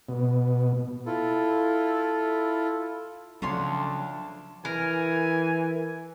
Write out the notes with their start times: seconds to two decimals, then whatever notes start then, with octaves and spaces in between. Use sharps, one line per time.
0.09 B2
1.06 E4 F4 A4
3.42 D2 C#3 F3 F#3 D4 A4 C#5 C6
4.65 E3 A#4 G#5